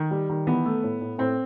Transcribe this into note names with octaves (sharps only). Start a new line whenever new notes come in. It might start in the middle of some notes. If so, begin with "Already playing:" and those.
Already playing: D#3
G3
D#3
E3 B3
A3
A2
A2
A2 C4